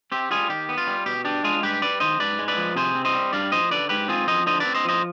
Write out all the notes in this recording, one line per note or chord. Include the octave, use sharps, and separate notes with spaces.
C4 G4
G3 F4 G#4
D#3 G4
B3
F4
G3
B2 G4
D4 G4
G#3 F4 G#4
G2 G4 B4
G3 B4 D5
D#3 C5 D#5
G#2 B4 D5
G#3
B4 D5
F3
C3 G#4 C5
C4
C5 D#5
G3
G2 D5 F5
F3 C5 D#5
D3 B4 D5
G#2 G4 B4
C4 F4 G#4
F3 C5 D#5
D3 C5 D#5
C4 B4 D5
C5 D#5
F3 C5 D#5